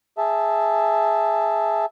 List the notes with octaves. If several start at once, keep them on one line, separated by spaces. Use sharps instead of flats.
G#4 E5 A5